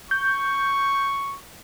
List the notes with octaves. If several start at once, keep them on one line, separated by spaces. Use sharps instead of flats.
C#6 G6